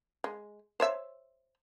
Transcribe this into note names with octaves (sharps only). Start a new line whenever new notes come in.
G#3
C5 C#5 E5